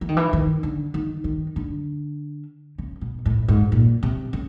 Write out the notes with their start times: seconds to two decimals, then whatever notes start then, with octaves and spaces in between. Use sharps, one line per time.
0.01 E3
0.09 D#3
0.17 E3
0.33 D#3
0.63 D3
0.94 D#3
1.24 D#3
1.56 D3
2.78 C#3
3.01 B2
3.26 A2
3.48 G#2
3.72 A#2
4.03 C3
4.33 C#3